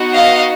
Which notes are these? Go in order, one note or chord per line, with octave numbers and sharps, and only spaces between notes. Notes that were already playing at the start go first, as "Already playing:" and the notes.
Already playing: B3 D#4 F#4
D#5 F5